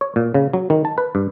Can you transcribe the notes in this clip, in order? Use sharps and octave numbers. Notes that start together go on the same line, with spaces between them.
C#5
A#2
C#3
F#3
D#3
A5
B4
G2